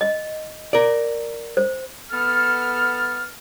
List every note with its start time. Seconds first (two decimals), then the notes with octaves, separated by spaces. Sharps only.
0.01 D#5
0.73 A#4 D5
1.57 C5
2.12 B3 A4 F6